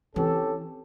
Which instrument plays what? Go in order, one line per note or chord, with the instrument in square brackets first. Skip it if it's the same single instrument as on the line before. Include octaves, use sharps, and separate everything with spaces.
[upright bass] E3 C4 [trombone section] C#4 G4 A4